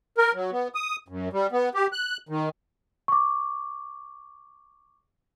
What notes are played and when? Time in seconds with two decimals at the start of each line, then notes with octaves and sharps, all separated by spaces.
0.18 A#4
0.34 F#3
0.51 B3
0.75 D#6
1.08 F#2
1.33 G3
1.52 B3
1.75 G4
1.93 F#6
2.29 D#3
3.08 C#6 D6